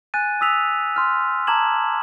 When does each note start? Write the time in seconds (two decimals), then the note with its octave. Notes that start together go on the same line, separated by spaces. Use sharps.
0.14 G#5 F#6 A6 D#7
0.41 D#6 E6 B6 F7
0.96 C6 F6
1.47 A5 A#5 D6 G#6 E7 F#7